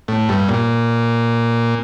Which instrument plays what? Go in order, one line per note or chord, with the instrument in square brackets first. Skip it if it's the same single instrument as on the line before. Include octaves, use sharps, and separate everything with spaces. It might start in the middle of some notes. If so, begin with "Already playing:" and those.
[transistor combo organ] A2
G2
A#2